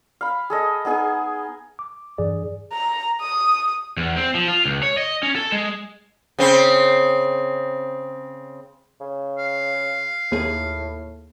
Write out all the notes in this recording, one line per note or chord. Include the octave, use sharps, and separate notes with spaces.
F5 B5
G#4 A4 D#5
B3 D#4 G#4 G#5
D6
G2 E3 G#4 D5
A#5
D#6
E2
C4
F3
F4
C#2
C#5
D#5
C#4
A4
G#3
C#3 C4
C#3
F5
D#2 A2 A#3 G#4